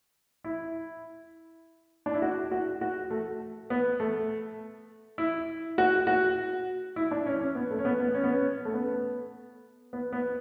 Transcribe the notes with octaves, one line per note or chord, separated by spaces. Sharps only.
E4
D4
E4
F#4
F#4
F#4
A3
B3
A3
E4
F#4
F#4
E4
D4
C#4
C#4
B3
A3
C#4
B3
B3
C#4
B3
C#4
A3
B3
B3
B3